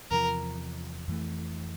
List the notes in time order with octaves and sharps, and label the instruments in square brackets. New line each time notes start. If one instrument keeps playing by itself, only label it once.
[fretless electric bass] E2 C3 F3 [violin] A#4
[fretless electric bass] F2 E3 A3